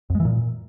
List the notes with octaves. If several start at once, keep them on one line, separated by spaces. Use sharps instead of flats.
F2
G#3
E3
A#2